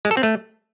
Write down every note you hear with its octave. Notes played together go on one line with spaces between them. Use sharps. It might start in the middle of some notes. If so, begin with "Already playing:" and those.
G#3
A4
C4
A3